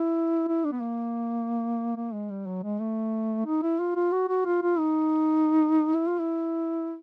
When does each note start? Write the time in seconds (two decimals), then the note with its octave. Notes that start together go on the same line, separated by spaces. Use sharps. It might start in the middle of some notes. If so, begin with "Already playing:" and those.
Already playing: E4
0.48 E4
0.64 D4
0.72 B3
0.80 A#3
1.96 A#3
2.13 G#3
2.30 G3
2.46 F#3
2.63 G#3
2.80 A3
3.46 D#4
3.62 E4
3.79 F4
3.96 F4
4.12 F#4
4.29 F#4
4.45 F4
4.62 F4
4.79 D#4
5.94 E4
6.07 F4
6.19 E4